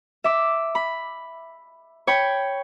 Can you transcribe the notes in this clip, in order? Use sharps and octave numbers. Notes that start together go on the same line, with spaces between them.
E5 D6
B5
C#5 G5 B5